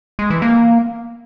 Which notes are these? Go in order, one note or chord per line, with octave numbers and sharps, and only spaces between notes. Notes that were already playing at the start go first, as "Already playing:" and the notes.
G#3
E3
A#3